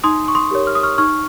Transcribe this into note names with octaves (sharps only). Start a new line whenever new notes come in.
D#4 C6 D#6
C#6
C6 D#6
G4 A#4 C#5
F6
D#6
C#6 F6
D#4 C#6 F6